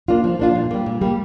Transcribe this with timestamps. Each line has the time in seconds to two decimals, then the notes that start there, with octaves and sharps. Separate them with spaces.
0.08 A#3 D4 F4
0.24 F3
0.39 A#3 D4 F4
0.55 A#2
0.71 G3 A#3
0.86 A#2
1.01 G3 A#3